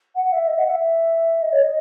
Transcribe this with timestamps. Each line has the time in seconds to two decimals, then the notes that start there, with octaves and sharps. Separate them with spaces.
0.16 F#5
0.33 E5
0.48 D#5
0.58 F#5
0.69 E5
1.42 D#5
1.53 C#5
1.63 D#5